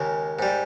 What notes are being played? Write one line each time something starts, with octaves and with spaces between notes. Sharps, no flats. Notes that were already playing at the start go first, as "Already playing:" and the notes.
Already playing: D#2 C#3 G#3 A#4
G#2 G3